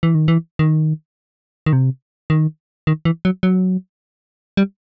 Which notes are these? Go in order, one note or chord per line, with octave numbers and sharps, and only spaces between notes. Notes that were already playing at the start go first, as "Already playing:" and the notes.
E3
D#3
E3
D#3
D#3
C3
D#3
D#3
E3
F#3
F#3
G3